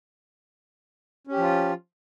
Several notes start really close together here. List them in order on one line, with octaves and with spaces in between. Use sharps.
C#4 G4 F3 F4